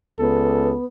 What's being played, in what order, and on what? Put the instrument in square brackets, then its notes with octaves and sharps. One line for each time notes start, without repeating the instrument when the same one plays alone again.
[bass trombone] C#2 [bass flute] B3 [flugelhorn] A4